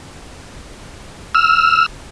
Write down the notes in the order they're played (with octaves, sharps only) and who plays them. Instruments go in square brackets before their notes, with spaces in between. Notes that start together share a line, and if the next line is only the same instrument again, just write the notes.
[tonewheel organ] E6 F6